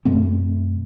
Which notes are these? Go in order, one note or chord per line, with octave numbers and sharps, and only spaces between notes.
F#2 B2 A3 C4